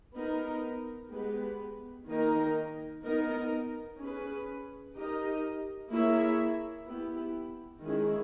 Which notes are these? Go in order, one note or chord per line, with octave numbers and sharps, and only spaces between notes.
B3 D#4 A#4
G#3 B3 G4 B4
D#3 A#3 D#4 A#4
B3 D#4 A#4
C#4 G#4 B4
D#4 G4 A#4 D#5
A#3 E4 G#4 C#5 E5
B3 E4 G4
D#3 G#3 C#4 E4 G#4